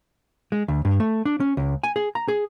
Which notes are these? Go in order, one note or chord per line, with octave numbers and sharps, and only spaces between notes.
G#3
D2
G2
A3
D4
C#4
C#2
G#5
G#4
A#5
G#4